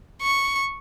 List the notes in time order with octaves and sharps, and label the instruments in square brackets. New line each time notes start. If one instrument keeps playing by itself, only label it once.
[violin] C#6